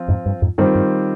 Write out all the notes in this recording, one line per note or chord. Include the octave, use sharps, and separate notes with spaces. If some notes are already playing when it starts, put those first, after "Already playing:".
Already playing: F3 C4 F4
F2 G#2
G2
F2 G#2
G2 D#3 G3 C4 F4 C5
G2